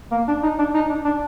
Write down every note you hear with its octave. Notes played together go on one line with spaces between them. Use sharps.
A#3
D4
D#4
D4
D#4
D4
D4